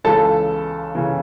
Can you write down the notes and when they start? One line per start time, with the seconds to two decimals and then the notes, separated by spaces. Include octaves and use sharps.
0.04 C#2 C#3 E3 A4 A5
0.95 C#3 E3